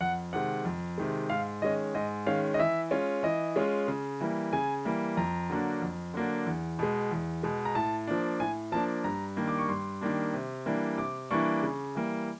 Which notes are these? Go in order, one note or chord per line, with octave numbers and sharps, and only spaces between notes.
F2 F#5
C3 D#3 G#3 F#5
F2
C3 D#3 G#3
G#2 F5
D#3 G#3 C#4 D#5
G#2 D#5
D#3 G#3 C#4 F5
D#5
E3 E5
G#3 C#4 F4
E3 D#5
G#3 C#4 F4
C#3
E3 G3 A#3
C#3 G#5
E3 G3 A#3
F2 A#5
D3 F#3 A#3 D4
F2
D3 F#3 A#3 D4
E2
B2 G#3
E2
B2 G#3
A#5
A2 A5
F3 A#3 D4
A2 G#5
F3 A#3 D4 A5
G2 A#5
D#3 G3 A#3 D4
D6
C#6
G2 C6
D#3 G3 A#3 D4
C3
E3 G3 A#3 D4
C3 D6
E3 G3 A#3 D4 C#6
C#3
E3 G3 A#3